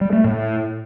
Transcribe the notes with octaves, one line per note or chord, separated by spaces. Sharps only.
G3
A3
A2